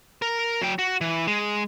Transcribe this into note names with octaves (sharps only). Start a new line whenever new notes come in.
A#4
F#3 G5
F#4
E3
G#3